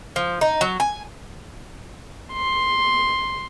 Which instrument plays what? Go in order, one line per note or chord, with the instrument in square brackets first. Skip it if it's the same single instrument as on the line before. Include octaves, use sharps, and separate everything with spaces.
[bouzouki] F3
D#4
F#3
G#5
[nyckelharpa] C6